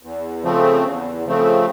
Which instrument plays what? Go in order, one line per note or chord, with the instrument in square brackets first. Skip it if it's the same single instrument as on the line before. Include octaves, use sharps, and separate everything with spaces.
[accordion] E2
C#3 F3 A3 C4
E2
C#3 F3 A3 C4